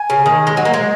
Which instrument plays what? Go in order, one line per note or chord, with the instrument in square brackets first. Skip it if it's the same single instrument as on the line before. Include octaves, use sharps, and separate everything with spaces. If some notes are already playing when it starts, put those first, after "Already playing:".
Already playing: [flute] G#5
[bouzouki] C#3
D#3
G#3
[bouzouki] F#3 [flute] D#5
[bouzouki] A#3
G#3